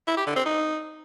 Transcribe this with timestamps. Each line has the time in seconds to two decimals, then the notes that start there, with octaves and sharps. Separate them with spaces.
0.08 E4
0.17 G4
0.27 D3
0.36 C4
0.46 D#4